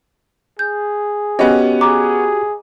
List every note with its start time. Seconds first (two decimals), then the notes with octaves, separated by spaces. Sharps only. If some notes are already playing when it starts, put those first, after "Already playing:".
0.59 G#4 G6
1.39 B3 C#4 F#4 G4 D#5
1.81 G#4 A#5 D6